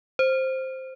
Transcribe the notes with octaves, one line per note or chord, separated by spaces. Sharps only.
C5